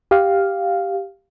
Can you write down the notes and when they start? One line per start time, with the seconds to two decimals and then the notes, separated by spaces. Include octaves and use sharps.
0.11 G4 F5